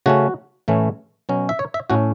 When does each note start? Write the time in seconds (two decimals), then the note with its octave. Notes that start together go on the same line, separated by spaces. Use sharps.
0.06 C#3 A3 C#4 F#4
0.68 A2 E3 A3 C#4
1.29 B2 F#3 C#4
1.49 E5
1.59 C#5
1.74 E5
1.90 A2 A3 C#4 F#4